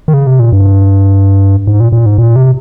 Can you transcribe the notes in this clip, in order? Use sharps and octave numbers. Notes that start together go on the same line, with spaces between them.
D#3
C#3
C3
A#2
G2
G#2
A#2
A#2
G#2
A#2
C3